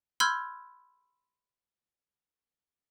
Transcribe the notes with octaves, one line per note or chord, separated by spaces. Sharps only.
B5 C6 E6 F6 G6 G#6